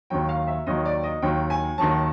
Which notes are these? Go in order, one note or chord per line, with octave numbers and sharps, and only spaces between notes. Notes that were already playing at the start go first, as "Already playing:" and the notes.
D#2 D#3 F#3 G5
F5
E5
D#2 D#3 F#3 D#5
D5
D#5
D#2 D#3 F#3 G5
G#5
D#2 D#3 F#3 A5